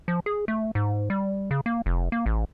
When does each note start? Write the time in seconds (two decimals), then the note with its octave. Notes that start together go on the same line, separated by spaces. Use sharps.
0.08 F3
0.26 G#4
0.48 A3
0.75 G#2
1.10 G3
1.51 C#3
1.66 A#3
1.86 F1
2.12 A#3
2.26 A1